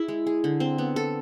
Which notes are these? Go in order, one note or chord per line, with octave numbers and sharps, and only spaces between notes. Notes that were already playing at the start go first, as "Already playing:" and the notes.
Already playing: E4 G#4
G#3
G#4
D3
C4
B3
A4